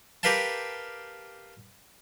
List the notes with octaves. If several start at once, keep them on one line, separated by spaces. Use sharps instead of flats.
G4 A#4 B4 F5 G5 A5